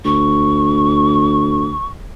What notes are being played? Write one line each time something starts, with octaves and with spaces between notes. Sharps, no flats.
D2 C#6